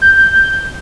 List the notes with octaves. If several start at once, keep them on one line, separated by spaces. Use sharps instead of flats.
G6